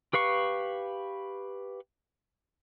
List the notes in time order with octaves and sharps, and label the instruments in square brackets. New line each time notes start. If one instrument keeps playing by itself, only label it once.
[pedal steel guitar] G4 B4 F5 C#6